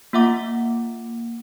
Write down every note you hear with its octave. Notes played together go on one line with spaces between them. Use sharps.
A#3 F4 E5 F#5 D6